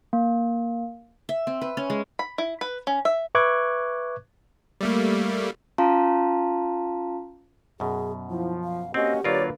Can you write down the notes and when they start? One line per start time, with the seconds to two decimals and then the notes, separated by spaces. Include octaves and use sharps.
0.13 A#3
1.29 E5
1.47 C4
1.61 B4
1.77 C#4
1.90 G#3
2.19 B5
2.38 E4
2.61 B4
2.87 C#4
3.05 E5
3.35 B4 E5 C#6 D6 F#6 G#6
4.81 G3 A3 A#3
5.78 C#4 F4 F5 A5 A#5 C6
7.80 F#2 B2 G#4
8.30 F3 E4
8.64 F5
8.94 A#3 C4 C#4 F#4 G4 D#5
9.24 D3 F#3 A#3 F4 A#4 B4 C#5 D5